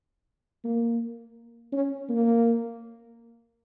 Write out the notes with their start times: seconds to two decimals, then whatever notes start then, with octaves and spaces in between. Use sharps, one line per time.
0.65 A#3
1.72 C#4
2.09 A#3